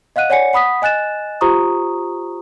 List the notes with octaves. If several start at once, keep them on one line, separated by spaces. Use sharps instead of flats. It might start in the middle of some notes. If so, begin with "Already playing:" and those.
D#5 F5 F#5 F#6 D#7
C#5 D5 F#5 G#5 C#7
F#5 B5 D#6 B6
D#5 G#5 F#6 A6 E7
F4 G4 C5 A#5 C#6 D#6